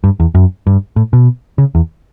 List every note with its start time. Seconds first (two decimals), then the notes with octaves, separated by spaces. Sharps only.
0.04 G2
0.20 E2
0.35 F#2
0.67 G2
0.96 A2
1.13 B2
1.58 C#3
1.75 E2